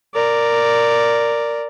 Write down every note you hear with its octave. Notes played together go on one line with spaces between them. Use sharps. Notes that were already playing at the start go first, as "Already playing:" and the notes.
A#4 D5